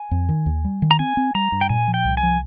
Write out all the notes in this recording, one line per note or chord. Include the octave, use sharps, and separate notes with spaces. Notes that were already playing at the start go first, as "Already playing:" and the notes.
Already playing: G#5
F2
D#3
D#2
G3
D#3
A#5
C4 G#5
C4
G3 A#5
G2
G5
A#2 G#5
F3
G5
C2
G#5
F3